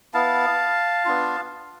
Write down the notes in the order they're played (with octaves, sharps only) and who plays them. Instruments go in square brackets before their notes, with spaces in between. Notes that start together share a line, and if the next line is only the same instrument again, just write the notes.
[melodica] B3 E4 F5 A5
B3 D4 F4